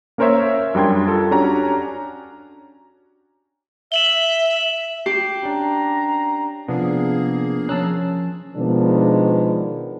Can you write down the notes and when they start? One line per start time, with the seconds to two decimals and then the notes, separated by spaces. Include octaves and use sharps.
0.18 A#3 C#4 A#4 C5 C#5 E5
0.75 F#2 G3 D4 G5 C6 G#6
1.07 F4 A4
1.31 C#4 D4 F#4 G4 A#5
3.92 E5 E7 F#7 G7
5.06 G4 C7
5.43 C#4 D4 A#5
6.68 C3 F3 A#3 B3 D4 G#4
7.69 F3 C#4 A5 A#5 E6 F#6
8.55 B2 D#3 F3 G#3 B3 D4